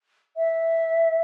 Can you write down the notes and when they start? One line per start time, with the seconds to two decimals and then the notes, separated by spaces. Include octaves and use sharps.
0.37 E5